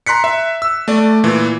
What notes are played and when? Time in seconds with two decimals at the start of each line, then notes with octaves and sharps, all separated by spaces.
0.06 A#5 C6 F#6 B6 C#7
0.24 E5
0.62 E6
0.88 A3 D5
1.24 A#2 E3